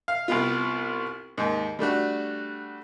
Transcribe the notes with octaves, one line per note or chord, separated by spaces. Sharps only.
F5
C2 B3 F4
D#2 G#2
G3 A3 D4 F#4